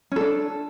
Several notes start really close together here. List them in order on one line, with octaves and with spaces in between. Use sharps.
C#4 A4 D4